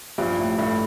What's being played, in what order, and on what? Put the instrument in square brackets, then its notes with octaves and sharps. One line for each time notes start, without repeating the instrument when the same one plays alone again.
[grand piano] A#1 [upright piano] G2
[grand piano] A2
[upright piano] G2 [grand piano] A3